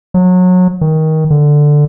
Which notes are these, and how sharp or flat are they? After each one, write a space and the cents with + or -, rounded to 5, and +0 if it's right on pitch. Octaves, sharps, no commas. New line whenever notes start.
F#3 -25
D#3 +20
D3 +5